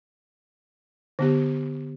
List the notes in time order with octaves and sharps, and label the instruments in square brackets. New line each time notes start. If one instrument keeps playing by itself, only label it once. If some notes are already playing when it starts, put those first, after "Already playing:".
[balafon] D3 B3 G4